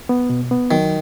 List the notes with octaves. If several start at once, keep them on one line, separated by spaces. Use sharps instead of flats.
B3
B2
B3
D#3 F#3